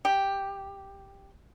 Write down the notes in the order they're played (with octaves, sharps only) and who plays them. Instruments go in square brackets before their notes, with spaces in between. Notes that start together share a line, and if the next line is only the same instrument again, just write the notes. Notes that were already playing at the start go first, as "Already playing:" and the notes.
[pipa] G4